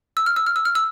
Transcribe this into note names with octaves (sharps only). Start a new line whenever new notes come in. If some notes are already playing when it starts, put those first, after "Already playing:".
E6
F6
E6
F6
E6
F6
E6